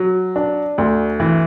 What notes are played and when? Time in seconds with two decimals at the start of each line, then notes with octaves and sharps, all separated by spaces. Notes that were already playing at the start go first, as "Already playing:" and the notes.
Already playing: F#3
0.36 D4
0.78 D2
1.20 E3